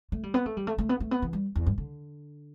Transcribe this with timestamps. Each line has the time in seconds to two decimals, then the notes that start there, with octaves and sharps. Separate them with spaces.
0.12 A3
0.23 G3
0.34 B3
0.46 A3
0.57 G3
0.67 A3
0.78 A3
0.89 B3
1.00 A3
1.11 B3
1.22 E3
1.33 G3
1.55 E2
1.66 G2
1.78 D3